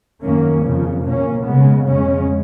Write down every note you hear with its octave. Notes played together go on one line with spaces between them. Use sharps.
F#2 D#3 A#3 C#4
F2 C#3 F3
B2 A#3 C#4
C#3 G#3 B3
F2 C#3 G#3 C#4